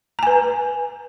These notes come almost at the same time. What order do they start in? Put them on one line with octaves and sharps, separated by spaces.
A#5 G#5 B4